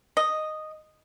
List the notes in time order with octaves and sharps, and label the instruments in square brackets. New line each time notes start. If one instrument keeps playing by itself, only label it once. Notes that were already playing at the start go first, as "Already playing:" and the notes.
[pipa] D#5